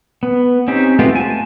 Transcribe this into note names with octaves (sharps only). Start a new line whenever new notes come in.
B3
C4 C#4 D#4 G4
G#3 A3 B3 F4 G4
G#5 A5